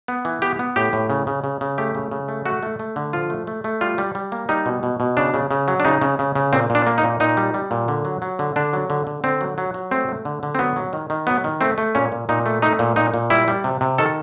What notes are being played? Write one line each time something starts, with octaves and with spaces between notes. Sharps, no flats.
B3
E3
B3 G4
B3
A2 G4
A2
C#3
C#3
C#3
C#3
A3 G4
C#3
C#3
A3
A3 F#4
A3
A3
D3
F3 F4
A3
A3
A3
G3 F4
G3
G3
A#3
G3 D#4
B2
B2
B2
C#3 D4
C#3
C#3
F#3
D4
C#3 D#4
C#3
C#3
C#3
A#2 C4
A#2
D4
A#3
D#4
A#2
A#2 D#4
G3
G3
A#2
D3
F#3
F#3
D3
D3 D4
F#3
D3
D3
D3 C4
F#3
F#3
F#3
A3 C4
A3
D3
D3
C4
F#3 B3
F#3
D#3
D#3
F#3 B3
D#3
A3 C4
A3
A#2 C#4
A#2
A#2 D#4
A3
A3 D#4
A#2
A#2 D#4
A#2
G3 E4
G3
C3
C3
D#3 A4